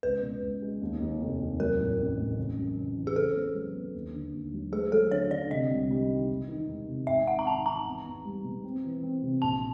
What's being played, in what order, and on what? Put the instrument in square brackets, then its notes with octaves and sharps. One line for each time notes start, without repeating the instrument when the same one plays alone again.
[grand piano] C#2 [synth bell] B4
[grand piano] B2
C#2
G#3
D#2
D#2
F1
D#2
[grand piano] F#3 [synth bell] A#4
[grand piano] A2
A1
A1
C#3
F#2
C#3
E3
[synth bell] G#4
[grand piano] C#3 [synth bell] A4
[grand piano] B3
F#3
B3
D#2
D3
D#2
F#3
[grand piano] A3 [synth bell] G#4
[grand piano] F#3 [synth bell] A4
[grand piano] D3 [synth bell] C#5
[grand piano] D3 [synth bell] D5
[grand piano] C3 [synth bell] D#5
[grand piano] C2
G3
D#3
E1
D#3
E1
C3
[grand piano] G#1 [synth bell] E5
[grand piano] D#3 [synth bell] F#5
[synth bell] A#5
[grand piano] D#3 [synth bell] A5
[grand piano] D#3 [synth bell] A#5
[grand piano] E2
E2
G3
B2
C4
E3
C4
C3
[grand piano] A#1 [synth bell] A5